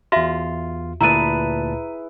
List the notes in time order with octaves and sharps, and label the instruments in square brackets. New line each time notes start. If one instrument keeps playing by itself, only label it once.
[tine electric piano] E2 F4 [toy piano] F#4 E5
[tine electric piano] D2 A#2 A5 [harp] E4 G#4 B4 [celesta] A#5 D#7